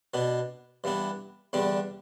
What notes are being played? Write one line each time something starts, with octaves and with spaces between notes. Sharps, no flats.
B2 B3 D4
G2 E3 B3 D4
E2 D3 G3 B3 D4